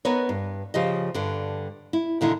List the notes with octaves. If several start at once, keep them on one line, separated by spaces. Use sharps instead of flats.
B3 D#4 A#4 B4 C#5
G2
C#3 F3 G4 D#5
G2 D3
E4
A#2 D3 D#3 E4